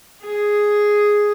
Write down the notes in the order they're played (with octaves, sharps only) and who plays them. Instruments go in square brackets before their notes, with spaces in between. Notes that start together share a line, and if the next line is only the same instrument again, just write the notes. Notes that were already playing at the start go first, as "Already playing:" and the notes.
[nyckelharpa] G#4